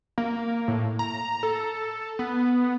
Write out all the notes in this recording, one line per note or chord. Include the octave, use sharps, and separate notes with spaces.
A#3
A2
A#5
A4
B3